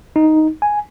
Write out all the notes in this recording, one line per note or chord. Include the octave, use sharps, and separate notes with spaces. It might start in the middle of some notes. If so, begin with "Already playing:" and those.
D#4
G#5